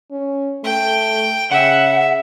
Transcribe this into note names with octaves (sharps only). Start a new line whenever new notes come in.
C#4
A3 G5
C#3 E5 F#5